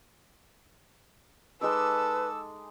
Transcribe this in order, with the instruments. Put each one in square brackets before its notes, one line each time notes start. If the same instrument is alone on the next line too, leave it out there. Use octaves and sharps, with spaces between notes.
[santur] G#3 D#4 D6 [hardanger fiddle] A4 [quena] B4 [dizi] E6